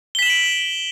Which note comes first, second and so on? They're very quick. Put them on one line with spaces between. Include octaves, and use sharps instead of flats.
G7 B6 E7 F#7 D7